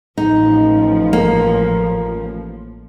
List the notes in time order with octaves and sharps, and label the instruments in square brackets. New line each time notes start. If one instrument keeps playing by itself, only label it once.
[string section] A1 F3 [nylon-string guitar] D#4
[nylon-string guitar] A#3